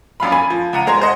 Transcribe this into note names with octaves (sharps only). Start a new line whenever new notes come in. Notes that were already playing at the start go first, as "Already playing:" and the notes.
A#1 F#2 F5 B5
G#5 B5 G#6
F3
C#2 F#5 A#5 D#7
F1 G#3 C5 A#5 C6 G#6
C5 D#5 F#5